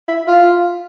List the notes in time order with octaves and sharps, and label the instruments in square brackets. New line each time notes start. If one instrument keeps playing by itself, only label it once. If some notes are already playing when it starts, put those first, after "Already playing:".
[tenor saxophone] E4
F4